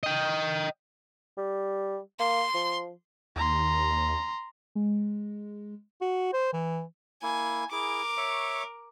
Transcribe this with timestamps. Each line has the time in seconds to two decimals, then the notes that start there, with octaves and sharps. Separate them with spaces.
0.03 D#5 G5
1.38 G3
2.20 A#3 C6
2.54 F3
3.36 D#2 A#5 C6
4.75 G#3
6.01 F#4
6.33 C5
6.53 E3
7.23 A#3 E4 G#5
7.72 E4 G#4 A#4 D6
8.17 C#5 E5 C#6